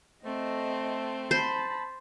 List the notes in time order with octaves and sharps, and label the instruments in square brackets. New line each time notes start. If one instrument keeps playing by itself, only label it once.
[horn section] A3 [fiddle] C4 [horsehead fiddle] D#5
[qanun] C5 [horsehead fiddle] A5 B5